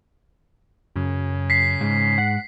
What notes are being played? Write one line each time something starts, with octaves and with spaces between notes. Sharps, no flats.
F#2 C#3
B6 C7
G#2
F#5